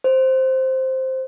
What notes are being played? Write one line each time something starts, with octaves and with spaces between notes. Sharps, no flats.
C5